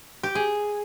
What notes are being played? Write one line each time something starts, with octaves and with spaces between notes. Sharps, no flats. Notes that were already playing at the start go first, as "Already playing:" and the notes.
G4
G#4